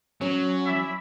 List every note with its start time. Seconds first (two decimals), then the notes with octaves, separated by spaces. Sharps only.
0.21 F#3 C#4 C#5
0.66 E4 D5 E5